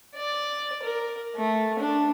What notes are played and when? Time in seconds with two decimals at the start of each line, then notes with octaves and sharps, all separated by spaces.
0.15 D5
0.83 A#4
1.36 A3
1.79 D4